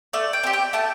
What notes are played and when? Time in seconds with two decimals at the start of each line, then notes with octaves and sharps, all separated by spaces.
0.13 A3 D5
0.33 G5
0.43 C4 G4
0.53 G5
0.73 A3 A5